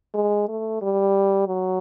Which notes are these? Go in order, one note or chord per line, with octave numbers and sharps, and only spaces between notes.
G#3
A3
G3
F#3